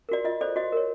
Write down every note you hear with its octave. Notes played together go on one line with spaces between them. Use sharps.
F#4 A#4 D5
F4 D#5
A4 C5 D5
F#4 D#5
A#4 C#5